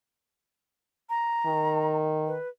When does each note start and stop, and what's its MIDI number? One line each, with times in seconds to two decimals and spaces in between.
1.10 1.97 82
1.47 2.36 51
2.27 2.49 71